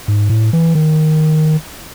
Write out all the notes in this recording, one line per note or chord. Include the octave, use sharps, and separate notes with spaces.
G#2
A2
E3
D#3